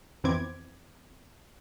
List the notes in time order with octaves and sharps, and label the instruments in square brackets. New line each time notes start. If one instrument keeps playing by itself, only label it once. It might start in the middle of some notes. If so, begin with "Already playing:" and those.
[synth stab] F2 E3 B3 C4 D6 G#6